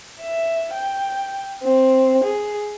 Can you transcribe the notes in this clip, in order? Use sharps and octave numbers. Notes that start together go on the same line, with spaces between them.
E5
G5
C4
G#4